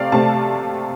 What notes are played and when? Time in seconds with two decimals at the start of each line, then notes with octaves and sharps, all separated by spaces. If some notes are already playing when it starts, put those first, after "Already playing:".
Already playing: C3 A3 C4 D5 F5
0.12 C3 A3 C4 A5